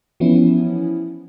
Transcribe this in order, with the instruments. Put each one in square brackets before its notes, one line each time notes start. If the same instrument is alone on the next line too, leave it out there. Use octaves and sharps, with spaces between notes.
[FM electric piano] E3 F3 B3 C#4 E4